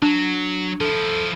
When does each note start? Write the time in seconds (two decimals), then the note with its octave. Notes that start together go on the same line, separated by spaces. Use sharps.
0.02 F#3 D4
0.81 F3 E4 A4